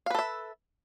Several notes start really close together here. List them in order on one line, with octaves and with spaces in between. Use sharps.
F5 B4 A4 E5